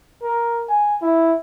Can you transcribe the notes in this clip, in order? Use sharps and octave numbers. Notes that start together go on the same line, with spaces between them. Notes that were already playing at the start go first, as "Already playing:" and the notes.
A#4
G#5
E4